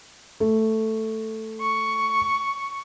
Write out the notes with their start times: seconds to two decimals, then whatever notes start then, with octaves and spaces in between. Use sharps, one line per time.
0.40 A3
1.61 C#6